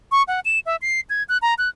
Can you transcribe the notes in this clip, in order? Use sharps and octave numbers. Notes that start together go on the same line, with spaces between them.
C#6
F#5
E7
E5
C7
G#6
F#6
A#5
F#6